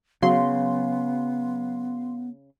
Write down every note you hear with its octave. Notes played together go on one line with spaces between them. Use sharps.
C#3 F#3 B3 F5 C6